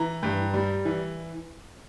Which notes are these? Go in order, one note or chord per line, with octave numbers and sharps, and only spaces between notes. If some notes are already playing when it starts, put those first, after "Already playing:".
Already playing: E3 A#5
G2
G3
E3